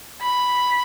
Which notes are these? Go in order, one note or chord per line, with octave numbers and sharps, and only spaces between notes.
B5